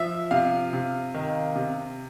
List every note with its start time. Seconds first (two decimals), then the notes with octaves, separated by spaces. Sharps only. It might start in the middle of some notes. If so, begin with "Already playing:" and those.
Already playing: F3 E5
0.31 C3 F5
0.73 C3
1.14 D#3
1.56 C3